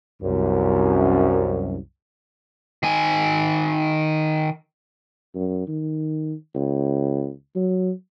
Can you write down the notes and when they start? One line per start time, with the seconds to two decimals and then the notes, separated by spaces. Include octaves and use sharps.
0.22 C2 F#2
2.83 D#3 G#5
5.35 F#2
5.68 D#3
6.55 C#2
7.56 F#3